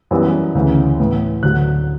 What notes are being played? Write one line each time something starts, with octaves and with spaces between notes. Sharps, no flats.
F#2 E3 G3 B3
D2 C#3 E3
A2 E3 B3
D2 D3 F#3 F#6